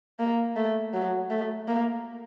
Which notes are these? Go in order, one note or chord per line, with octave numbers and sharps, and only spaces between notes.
A#3
A3
F#3
A3
A#3